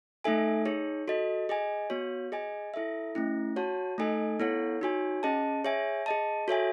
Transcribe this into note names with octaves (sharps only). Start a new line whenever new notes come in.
A3 D#4 A4 E5 G#5
D#4 G#4 C#5
F#4 A4 D#5
G#4 D#5 G#5
B3 F#4 C#5
G#4 D#5 G#5
E4 A4 E5
A3 C#4 E4
F#4 C#5 F#5 A5
A3 D#4 A4 D#5 G#5
B3 E4 A4 C#5 F#5
D#4 F#4 C#5 G#5
C#4 G#4 D#5 A5
G#4 C#5 E5 G#5
G#4 D#5 A5
F#4 A4 C#5 E5 G#5